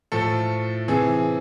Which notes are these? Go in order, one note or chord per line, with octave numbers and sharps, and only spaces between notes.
A2 F3 A4
C3 E3 G#4